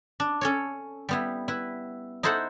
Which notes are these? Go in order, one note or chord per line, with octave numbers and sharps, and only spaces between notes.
D4
C#4 A4 C#5
G3 B3 E4
E4 B4
D#4 E4 A4 C5 E5 F#5